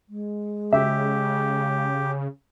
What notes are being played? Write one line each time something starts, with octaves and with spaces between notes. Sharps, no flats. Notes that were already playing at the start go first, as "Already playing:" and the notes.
G#3
C#3 G4 E5